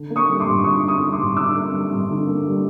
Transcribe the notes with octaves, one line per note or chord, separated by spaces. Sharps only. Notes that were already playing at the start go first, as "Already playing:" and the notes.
Already playing: D3
A#3
C#6 D#6
G3
C6 D6
G2
D3 C#6 D#6
A#3
C#6 D#6
G3
C6 D6
G2
D3 D6 E6
A#3
G3
G2
D3
A#3
G3